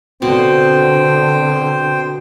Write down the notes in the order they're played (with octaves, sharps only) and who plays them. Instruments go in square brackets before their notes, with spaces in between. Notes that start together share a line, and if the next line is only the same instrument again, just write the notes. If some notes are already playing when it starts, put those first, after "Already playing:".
[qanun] B2 [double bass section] D3 [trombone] C4 [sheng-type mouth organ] C5 G5